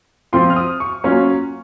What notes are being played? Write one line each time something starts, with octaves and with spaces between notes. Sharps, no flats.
F3 C4 F4 C6
F6
D#6
C#6
F#3 A#3 C#4 F4